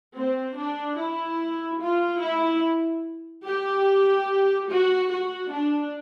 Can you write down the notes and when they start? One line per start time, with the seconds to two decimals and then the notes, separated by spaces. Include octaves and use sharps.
0.16 C4
0.58 D4
0.98 E4
1.81 F4
2.22 E4
3.46 G4
4.70 F#4
5.11 F#4
5.52 D4